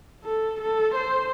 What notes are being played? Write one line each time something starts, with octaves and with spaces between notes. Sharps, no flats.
A4
A4
C5